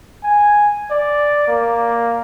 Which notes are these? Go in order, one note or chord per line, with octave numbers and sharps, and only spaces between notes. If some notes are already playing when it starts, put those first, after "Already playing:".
G#5
D5
A#3